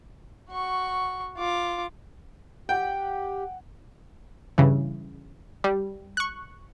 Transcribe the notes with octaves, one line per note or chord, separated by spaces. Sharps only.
F#4 C#6
F4 D6
G4 F#5 G5
G2 C#3 E3
G3
C#6 F#6